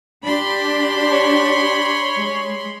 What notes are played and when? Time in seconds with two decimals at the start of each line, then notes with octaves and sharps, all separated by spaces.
0.24 D4 G4 B5 C6
1.12 C#5
2.17 G#3